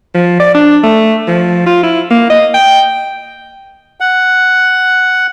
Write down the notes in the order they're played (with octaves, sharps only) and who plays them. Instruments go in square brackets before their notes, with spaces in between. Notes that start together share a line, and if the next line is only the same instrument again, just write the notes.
[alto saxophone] F3
D5
D4
A3
F3
F4
E4
A#3
D#5
G5
[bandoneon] F#5